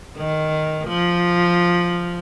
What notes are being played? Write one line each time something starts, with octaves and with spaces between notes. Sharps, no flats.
D#3
F3